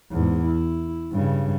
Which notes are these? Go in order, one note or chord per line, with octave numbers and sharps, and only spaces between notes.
E2 G#2
E4
G2 C#3